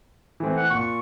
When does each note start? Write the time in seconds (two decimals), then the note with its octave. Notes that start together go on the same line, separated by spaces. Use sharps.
0.40 E3 A3 C4
0.57 F#5
0.71 A#2 C#6